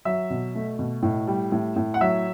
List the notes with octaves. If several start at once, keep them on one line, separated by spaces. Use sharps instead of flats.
F#3 E5
B2
A3
B2
A2
G3
A2
A2
F#5
F#3 E5